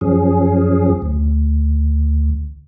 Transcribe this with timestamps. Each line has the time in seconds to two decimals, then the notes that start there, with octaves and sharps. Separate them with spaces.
0.01 F#2 F3 C#4 G#4
1.02 D2